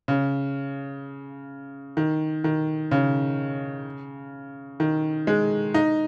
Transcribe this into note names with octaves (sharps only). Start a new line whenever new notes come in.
C#3
D#3
D#3
C#3
D#3
G#3
D#4